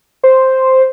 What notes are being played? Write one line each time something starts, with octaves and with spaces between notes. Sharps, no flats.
C5